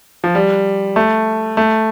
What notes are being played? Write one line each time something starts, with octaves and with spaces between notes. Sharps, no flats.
F3
G3
A3
A3